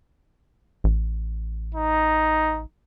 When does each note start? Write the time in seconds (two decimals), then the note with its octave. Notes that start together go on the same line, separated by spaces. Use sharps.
0.84 A1
1.75 D#4